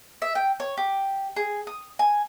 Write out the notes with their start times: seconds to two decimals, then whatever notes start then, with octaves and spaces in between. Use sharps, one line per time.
0.22 E5
0.35 G5
0.60 C#5
0.77 G4
1.36 G#4
1.67 D#6
1.99 G#5